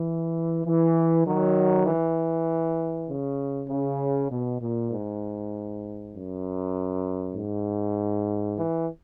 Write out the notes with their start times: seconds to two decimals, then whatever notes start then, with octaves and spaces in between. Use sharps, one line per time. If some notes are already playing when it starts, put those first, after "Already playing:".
Already playing: E3
0.64 E3
1.25 D#3 F#3
1.86 E3
3.07 C#3
3.68 C#3
4.30 B2
4.60 A#2
4.90 G#2
6.12 F#2
7.33 G#2
8.56 E3